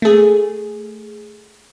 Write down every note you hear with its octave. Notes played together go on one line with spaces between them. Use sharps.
A3 G#4